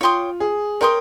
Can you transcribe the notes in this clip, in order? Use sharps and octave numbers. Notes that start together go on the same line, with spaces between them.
F4 C#5 G5 C6 D#6
G#4
A#4 C#5 G5 C6 D#6